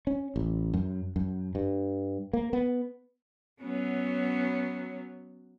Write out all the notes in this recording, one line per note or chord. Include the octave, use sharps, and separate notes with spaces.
C#4
A1
F#2
F#2
G2
A#3
B3
F#3 B3 C#4